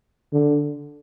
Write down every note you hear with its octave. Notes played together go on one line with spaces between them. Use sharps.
D3